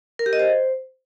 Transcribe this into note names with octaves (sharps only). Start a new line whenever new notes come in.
A#4
G4
D#5
C5